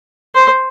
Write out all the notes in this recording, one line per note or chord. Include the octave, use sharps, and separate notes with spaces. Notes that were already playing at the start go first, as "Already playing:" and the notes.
C5